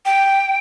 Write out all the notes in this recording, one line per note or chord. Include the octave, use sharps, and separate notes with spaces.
G5